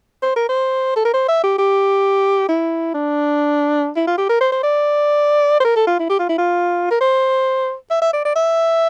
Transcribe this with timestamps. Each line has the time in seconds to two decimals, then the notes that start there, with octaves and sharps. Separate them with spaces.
0.23 C5
0.36 A#4
0.49 C5
0.96 A4
1.05 A#4
1.13 C5
1.28 E5
1.43 G4
1.59 G4
2.49 E4
2.94 D4
3.96 E4
4.07 F4
4.18 G4
4.29 A#4
4.40 C5
4.52 C5
4.63 D5
5.60 C5
5.64 A#4
5.76 A4
5.87 F4
5.99 E4
6.09 G4
6.19 F4
6.29 E4
6.38 F4
6.91 A#4
7.01 C5
7.91 E5
8.02 E5
8.13 D5
8.25 D5
8.35 E5